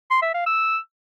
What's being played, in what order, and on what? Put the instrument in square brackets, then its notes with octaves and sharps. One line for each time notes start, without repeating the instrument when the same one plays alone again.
[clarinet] C6
E5
F5
E6